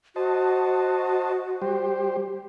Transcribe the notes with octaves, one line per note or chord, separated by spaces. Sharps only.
F#4 C5 D#5 A5
G3 G4 C5